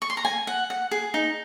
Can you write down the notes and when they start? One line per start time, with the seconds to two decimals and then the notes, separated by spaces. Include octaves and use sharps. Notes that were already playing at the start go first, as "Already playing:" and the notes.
0.02 C#6
0.10 C6
0.17 A#5
0.25 G#5
0.47 F#5
0.70 F#5
0.91 G#4
1.14 D#4